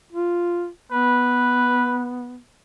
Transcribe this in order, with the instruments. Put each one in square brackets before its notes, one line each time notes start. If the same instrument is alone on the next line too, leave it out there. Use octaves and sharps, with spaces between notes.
[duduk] F4
[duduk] B3 [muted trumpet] B4